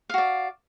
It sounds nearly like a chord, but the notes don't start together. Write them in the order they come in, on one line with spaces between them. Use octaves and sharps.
F5 F#4 D5